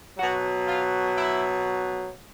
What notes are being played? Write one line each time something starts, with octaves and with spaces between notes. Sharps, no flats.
B2 F#3 F#4
F4
E4